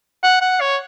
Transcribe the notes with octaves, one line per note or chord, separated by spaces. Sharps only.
F#5
F#5
C#5